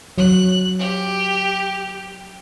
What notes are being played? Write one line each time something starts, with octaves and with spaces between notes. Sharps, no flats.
F#3 F#6
G4